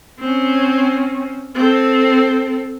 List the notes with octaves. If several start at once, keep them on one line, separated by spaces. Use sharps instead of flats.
C4 C#4
C4 A4